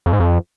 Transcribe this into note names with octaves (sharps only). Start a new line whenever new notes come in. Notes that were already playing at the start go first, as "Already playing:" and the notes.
F2
G#2
F2